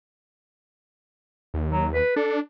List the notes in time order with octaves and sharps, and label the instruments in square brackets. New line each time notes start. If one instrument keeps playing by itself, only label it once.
[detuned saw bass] D#2
[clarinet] F#3
B4
[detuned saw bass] D4 [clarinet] A4